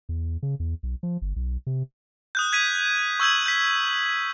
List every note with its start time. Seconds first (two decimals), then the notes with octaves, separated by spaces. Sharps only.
0.09 E2
0.43 C#3
0.60 E2
0.83 B1
1.03 F3
1.22 G1
1.36 B1
1.67 C3
2.35 D#6 F#6 G6
2.53 G#6 B6 D#7
3.20 C#6 E6 G6 G#6 F#7
3.46 G6 B6